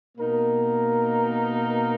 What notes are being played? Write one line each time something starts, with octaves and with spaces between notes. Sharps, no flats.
B2 A#3 D#4 A#4